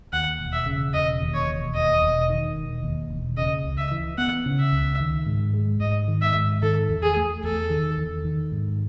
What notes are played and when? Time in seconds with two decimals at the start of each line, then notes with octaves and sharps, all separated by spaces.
0.13 D#2 F#5
0.39 E1
0.53 E5
0.66 C#3
0.94 E1 D#5
1.21 D#2
1.34 C#5
1.48 E1
1.74 D#2 D#5
2.02 E1
2.29 D#3
2.56 E1
2.83 D#2
3.10 E1
3.37 C#3 D#5
3.64 C#2
3.78 E5
3.91 E3
4.18 B3 F#5
4.46 C#3
4.60 E5
4.73 C#2
5.00 D#3
5.26 G#2
5.54 G#3
5.80 G#2 D#5
6.08 D#3
6.22 E5
6.35 G#2
6.62 D#3 A4
6.90 E2
7.03 G#4
7.16 A3
7.44 E2 A4
7.70 D#3
7.97 E2
8.25 D#3
8.52 G#2